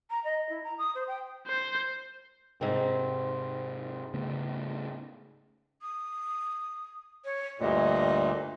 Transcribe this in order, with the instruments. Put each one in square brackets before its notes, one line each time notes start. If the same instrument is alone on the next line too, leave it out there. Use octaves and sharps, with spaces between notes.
[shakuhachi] A#5
D#5
E4
A#5
D#6
C5
G5
[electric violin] C5
[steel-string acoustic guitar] G#2 C4 [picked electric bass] C3 G#3
[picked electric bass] C#3 A3 B3
[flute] D#6
C#5
[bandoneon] D2 G2 A#2 [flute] D#5